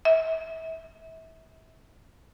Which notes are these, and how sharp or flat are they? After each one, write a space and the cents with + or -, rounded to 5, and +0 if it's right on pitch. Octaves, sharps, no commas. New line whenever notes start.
E5 -30